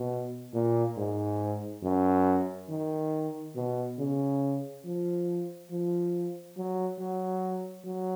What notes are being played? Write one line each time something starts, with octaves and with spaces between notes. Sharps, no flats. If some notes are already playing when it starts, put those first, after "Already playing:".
Already playing: B2
A#2
G#2
F#2
D#3
B2
C#3
F3
F3
F#3
F#3
F#3